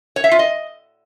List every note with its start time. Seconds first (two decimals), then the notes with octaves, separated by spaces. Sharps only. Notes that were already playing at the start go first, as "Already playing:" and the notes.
0.16 C#5
0.24 E5
0.31 F4
0.39 D#5